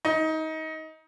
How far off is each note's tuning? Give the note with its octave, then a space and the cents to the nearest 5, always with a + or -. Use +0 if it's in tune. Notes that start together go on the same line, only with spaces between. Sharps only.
D#4 +25